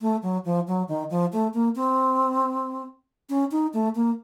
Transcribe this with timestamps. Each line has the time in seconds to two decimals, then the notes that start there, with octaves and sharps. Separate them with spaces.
0.01 A3
0.22 F#3
0.45 F3
0.67 F#3
0.88 D#3
1.10 F3
1.32 A3
1.54 A#3
1.75 C4
3.29 C#4
3.51 D#4
3.73 A3
3.95 A#3